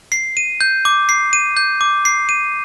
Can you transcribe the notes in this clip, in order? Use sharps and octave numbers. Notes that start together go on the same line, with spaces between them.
C7
D#7
G6
D6
C7
D#7
G6
D6
C7
D#7